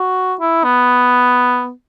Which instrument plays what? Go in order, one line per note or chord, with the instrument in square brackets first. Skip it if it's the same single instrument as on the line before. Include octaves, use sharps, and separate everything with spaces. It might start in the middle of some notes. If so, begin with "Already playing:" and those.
Already playing: [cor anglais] F#4
E4
B3